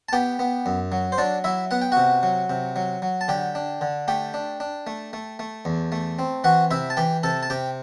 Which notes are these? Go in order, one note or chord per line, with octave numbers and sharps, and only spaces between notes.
A5
B3 G4 G5
B3
F#2
F#3
C5
F#3 D4 D5
F#3 E4 E5
B3 F#5
G5
C3 F#4 F#5
F#3
C3
F#3
F#3
A5
D3 G4 G5
D4
D3
A3 G4 G5
D4
D4
A3
A3
A3
E2
A3
C4
E3 F#4 F#5
C3 E4 E5
A5
E3 G4 G5
C3 A4 A5
A5
C3 G4 G5